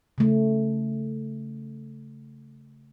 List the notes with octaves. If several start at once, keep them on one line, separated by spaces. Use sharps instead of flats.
C#3 A3